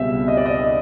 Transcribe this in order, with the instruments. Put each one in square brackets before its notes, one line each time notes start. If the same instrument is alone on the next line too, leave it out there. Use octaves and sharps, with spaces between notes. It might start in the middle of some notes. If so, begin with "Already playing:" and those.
Already playing: [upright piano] C#2 B2 G3 C4 [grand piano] E5
[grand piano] D#5
D5
D#5